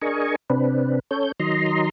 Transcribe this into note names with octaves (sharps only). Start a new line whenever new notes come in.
D4 G#4 A#4 D#5 G#5 C#6
C3 C4 D4 B4
C#4 A4 C#5 G6
D#3 F#3 D#5 A#5 C6